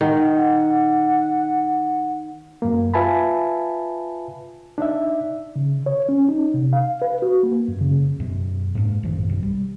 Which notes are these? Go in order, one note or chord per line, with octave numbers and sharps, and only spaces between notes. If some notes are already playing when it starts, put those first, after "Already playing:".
D#3 F#5
F#2 A#3
F4 B4 E5 G#5 A5 B5
D4 D#4 D5 E5
C#3
C#5
C#4
D#4
C3
F5
B4
F#4
A#3
F#2
C#3
F#2 B2
G#2 A#3 C#4 D4
A1 F#2 D#3 F3
A#1 G2 B2
G3